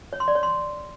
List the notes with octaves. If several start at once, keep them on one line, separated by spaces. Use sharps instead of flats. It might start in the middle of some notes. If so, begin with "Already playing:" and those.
C#5
C6
D5
C#5
C6